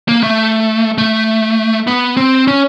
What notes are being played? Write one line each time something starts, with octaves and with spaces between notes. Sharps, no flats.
A#3
A3
A3
B3
C4
C#4